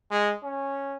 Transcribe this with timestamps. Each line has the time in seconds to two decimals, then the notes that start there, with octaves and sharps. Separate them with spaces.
0.11 G#3
0.43 C#4